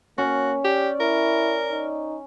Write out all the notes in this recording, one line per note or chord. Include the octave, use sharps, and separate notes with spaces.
A#3 C#4 F#4
G4 D5
E4 A#4
D#4